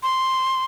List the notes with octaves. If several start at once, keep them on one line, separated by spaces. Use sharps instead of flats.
C6